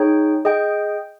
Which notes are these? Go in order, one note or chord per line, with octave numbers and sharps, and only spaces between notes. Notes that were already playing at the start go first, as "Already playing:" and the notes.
Already playing: D#4 G#4 C#5 G5
G#4 D#5 G5